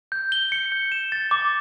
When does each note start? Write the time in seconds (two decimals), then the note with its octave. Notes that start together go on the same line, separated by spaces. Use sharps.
0.12 G6
0.32 G7
0.52 C#7
0.72 G6
0.92 E7
1.12 A6
1.31 D6